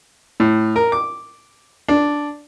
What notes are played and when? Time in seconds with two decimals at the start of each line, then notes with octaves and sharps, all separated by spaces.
0.40 A2
0.76 A#4
0.92 D6
1.88 D4